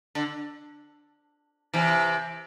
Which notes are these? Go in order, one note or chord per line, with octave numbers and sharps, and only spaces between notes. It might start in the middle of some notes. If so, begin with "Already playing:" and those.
D3
C3 E3